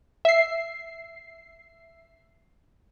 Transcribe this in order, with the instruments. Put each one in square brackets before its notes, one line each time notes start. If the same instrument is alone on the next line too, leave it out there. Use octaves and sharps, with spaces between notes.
[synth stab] E5 C7